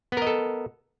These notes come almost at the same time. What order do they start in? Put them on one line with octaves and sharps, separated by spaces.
B3 A#4 D#5 A4